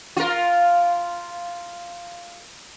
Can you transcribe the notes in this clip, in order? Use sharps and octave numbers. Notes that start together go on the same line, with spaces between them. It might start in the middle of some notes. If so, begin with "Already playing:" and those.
F4 A#4